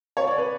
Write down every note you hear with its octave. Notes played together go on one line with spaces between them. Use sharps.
C#5
D5
B4